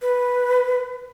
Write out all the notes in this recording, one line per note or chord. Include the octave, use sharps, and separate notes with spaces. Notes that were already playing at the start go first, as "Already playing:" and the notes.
B4